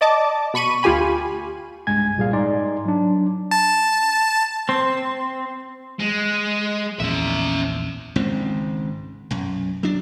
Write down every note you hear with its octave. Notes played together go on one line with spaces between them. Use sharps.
D5 D#5 A5 D6
B2 B5 C#6 D#7
D2 F4 G4 G#5 B5
C2 G2 G#3 G#5 G#6
C2 A#2 G3 G#4 F5
G#2 D#4 D5 G#5 C6
F#3 D4
A5
C4
G#3
A#1 E2 C#4 E5
G#1 C#2 G#2 C4
B1 F#2
F#3 D4